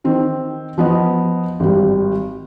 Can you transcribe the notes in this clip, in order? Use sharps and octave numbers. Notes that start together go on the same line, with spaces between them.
D#3 C4
F3 B3 D#5
G#1 G3